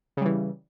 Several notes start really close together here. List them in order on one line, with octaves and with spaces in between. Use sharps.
C#3 G3 E3